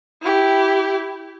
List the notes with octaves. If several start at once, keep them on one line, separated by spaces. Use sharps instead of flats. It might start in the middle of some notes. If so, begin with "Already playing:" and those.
E4 G4